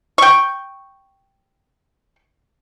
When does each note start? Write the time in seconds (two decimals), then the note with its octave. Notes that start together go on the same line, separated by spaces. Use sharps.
0.18 G5 C#6